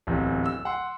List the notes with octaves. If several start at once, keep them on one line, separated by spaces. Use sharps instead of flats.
D1 E2 C3
E6
F#5 C6